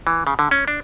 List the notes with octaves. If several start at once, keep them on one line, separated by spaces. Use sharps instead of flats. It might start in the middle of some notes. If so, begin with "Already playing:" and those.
E3
C#3
D3
C#4
D4